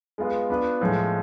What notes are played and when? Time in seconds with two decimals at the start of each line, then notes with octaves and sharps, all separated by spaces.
0.18 G#3 B3 F4 B4
0.50 B3 D4 F4 B4
0.81 A2 F3 G#3